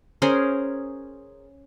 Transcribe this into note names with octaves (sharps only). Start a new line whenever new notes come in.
C#4 G#4 A#4 C5